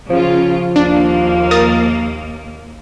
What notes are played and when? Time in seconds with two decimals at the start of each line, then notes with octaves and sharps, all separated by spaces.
0.10 C#3 F3 F4
0.76 D#2 A#3 D4
1.51 A#4 D#6 A6